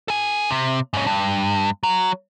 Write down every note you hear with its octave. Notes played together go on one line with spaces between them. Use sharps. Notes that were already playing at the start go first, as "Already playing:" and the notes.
A4 G#5
C3
G#2 C#4
G2
F#3